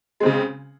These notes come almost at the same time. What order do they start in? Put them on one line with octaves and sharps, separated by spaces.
G#3 C4 C#3